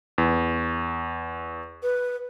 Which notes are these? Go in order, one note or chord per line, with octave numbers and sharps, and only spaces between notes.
E2
B4